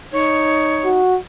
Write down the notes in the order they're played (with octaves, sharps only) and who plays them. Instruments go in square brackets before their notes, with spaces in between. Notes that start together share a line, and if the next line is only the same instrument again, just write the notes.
[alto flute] D#4 [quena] C#5
[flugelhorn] F#4